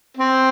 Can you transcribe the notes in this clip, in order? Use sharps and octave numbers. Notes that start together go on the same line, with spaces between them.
C4